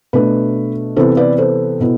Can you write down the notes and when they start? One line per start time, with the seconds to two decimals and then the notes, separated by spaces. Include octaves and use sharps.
0.13 B2 A3 D4 B4
0.96 C3 E3 B3 E4 A4 C5
1.17 B4 D5
1.38 A4 C5
1.80 B2 B3 E4